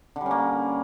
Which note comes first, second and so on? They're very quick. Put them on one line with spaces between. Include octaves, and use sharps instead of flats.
D3 G3 C#4 A#3